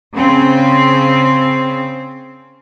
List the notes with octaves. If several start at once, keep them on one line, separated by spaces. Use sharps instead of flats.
C#3 C4